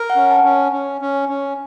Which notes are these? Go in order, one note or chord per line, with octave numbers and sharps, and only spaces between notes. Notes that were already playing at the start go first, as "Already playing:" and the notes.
Already playing: A#4
F#5
C#4
A5
C#4
C#4
C#4
C#4